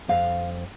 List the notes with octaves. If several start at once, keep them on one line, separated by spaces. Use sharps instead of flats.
F2 F5